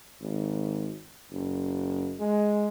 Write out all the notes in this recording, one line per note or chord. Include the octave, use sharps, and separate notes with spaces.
G#1
F#1
G#3